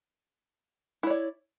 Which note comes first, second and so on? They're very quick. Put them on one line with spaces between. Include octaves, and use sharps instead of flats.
E4 C#5 D5